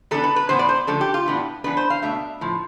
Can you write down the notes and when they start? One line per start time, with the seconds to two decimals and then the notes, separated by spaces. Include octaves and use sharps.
0.11 E3 B3 D4 A4
0.24 B4
0.36 B4
0.49 A2 E3 B3 C5
0.59 D5
0.69 C5
0.87 D3 F3 A3 D4 A4
1.01 G4
1.14 F4
1.26 A2 E3 B3 D4
1.64 E3 B3 D4 B4
1.77 C5
1.90 F5
2.02 B2 A3 D4 E5
2.41 A2 F3